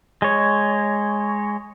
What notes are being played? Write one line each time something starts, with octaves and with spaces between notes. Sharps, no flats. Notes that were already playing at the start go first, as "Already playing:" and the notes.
G#3 C#5